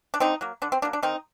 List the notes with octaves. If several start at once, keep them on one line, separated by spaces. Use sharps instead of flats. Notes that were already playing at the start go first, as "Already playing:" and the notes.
D4
D3 C4 D#4
F#3 A#3
D3 D4
C4
F#3 A#3 D4
D4
D#3 C4 D#4